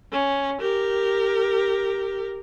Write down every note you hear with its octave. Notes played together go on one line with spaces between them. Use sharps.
C#4
G4 A#4